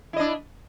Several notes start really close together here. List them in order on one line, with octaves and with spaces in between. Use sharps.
E4 D#5 D4